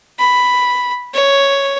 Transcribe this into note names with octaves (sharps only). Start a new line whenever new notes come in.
B5
C#5